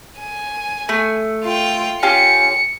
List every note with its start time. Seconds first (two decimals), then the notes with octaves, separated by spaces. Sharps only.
0.19 G#5
0.89 A3
1.44 F4 G5
2.03 C#4 F4 G4 C#7